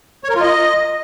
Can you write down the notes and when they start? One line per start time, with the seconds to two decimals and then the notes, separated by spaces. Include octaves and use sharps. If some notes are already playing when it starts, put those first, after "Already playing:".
0.24 C#5
0.30 A#4
0.36 F4
0.41 D#5